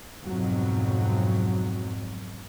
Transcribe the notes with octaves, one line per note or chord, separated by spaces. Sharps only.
F2 G#2 B2 F#3